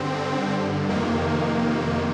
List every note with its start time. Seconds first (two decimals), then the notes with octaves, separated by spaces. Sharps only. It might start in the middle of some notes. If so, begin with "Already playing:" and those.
Already playing: G2 D3 C4
0.89 F2 C3 D#3 A#3